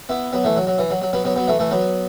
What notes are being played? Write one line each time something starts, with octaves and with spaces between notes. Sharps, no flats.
B3 E4
F#3 B3
E3 A3
F#3
F#3
E3
F#3
F#3
F#3 B3
F#3 B3
F#3 B3
E3 A3
E3 A3
F#3 B3